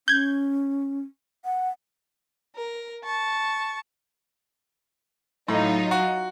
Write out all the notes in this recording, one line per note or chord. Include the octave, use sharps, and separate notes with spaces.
C#4 G6 G#6
F#5
A#4
A5 C#6
A2 F#3 D#4 F4
F#4